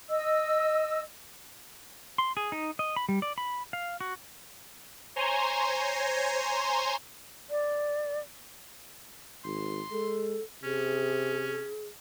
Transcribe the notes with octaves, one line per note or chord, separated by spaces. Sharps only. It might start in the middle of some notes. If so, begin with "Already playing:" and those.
D#5 E6
C6
G#4
D#4
D#5
B5
G3
D5
B5
F5
F#4
C5 C#5 G#5 A#5 C6
D5
G#1 C6
G#3 A4
C3 C#4 G#4